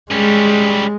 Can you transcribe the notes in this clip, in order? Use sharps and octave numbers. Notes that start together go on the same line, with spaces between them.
G3 G#3 C#4